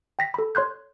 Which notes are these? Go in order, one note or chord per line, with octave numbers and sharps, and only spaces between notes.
G5 A#6 B6
A4 B5
C#5 C6 F#6 G6